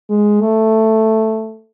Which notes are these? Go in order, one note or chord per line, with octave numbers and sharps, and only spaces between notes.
G#3
A3